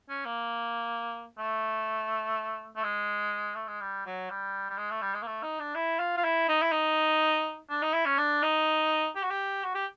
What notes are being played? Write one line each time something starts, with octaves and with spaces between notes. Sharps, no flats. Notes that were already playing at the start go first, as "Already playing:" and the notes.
C#4
A#3
A3
A3
G#3
A3
G#3
G3
F#3
G3
G3
G#3
A3
G3
G#3
A#3
A3
D#4
D4
E4
F4
F4
E4
D#4
E4
D#4
D4
D#4
E4
C#4
D4
D#4
G4
F#4
G4
F#4
G4